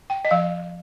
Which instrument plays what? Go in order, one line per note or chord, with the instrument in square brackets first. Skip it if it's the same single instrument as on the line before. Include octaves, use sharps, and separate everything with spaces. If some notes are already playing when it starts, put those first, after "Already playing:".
[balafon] G5
D#5
F3 F5